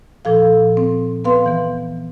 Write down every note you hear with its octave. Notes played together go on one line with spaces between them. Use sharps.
A#2 F3 A4 F5
C4
B3 B4 F5 C6
E3 B3